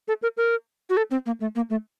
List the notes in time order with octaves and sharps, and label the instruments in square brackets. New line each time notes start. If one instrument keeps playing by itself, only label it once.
[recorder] A4
A#4
A#4
F#4
A4
C4
A#3
A3
A#3
A3